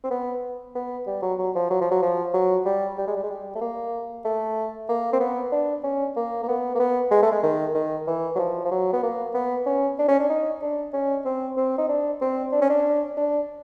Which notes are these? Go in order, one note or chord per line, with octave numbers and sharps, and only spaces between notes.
C4
B3
B3
G3
F#3
F#3
F3
F#3
F3
F#3
F3
F#3
G3
G3
G#3
G3
G#3
G3
A3
A#3
A3
A#3
C4
B3
D4
C#4
A#3
A#3
B3
A#3
B3
G#3
A3
G#3
D#3
D#3
E3
F#3
F3
F3
F#3
B3
A#3
B3
C#4
D4
C#4
D4
D#4
D4
C#4
C4
C4
D#4
D4
C4
D4
C#4
D4
D4